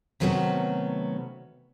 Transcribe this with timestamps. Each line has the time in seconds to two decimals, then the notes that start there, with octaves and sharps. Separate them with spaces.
0.20 C3 D#3 F#3 A3 B3 C#4